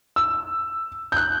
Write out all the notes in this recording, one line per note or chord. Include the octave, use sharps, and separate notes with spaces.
E6
G6
F#6